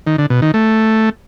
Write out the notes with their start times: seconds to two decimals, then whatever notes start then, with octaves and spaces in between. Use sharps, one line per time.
0.07 D#3
0.18 D3
0.30 B2
0.42 D#3
0.54 A3